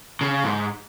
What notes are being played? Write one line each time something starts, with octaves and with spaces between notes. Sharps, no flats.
C#3
G#2